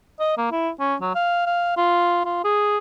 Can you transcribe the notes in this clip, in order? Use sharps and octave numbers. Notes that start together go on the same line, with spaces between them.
D#5
A#3
E4
C#4
F#3
F5
F5
F4
F4
G#4